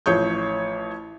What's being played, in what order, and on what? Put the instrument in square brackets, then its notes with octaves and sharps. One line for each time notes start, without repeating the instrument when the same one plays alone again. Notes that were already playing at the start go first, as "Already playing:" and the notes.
[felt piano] A1 F3 C#5 C#6 G6